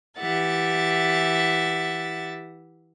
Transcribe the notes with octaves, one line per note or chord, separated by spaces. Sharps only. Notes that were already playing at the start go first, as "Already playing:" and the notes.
E3 G4 E5 F#5 A6